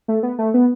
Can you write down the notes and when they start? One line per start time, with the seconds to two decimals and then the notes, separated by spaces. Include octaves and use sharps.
0.08 A3
0.23 B3
0.38 A3
0.54 B3